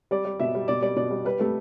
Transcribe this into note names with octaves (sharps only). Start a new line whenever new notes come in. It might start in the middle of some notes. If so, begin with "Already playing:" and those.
G3 D5
G3
B2 E5
G3
B2 D5
G3 D5
B2 D5
G3
G3 B4
G3 A3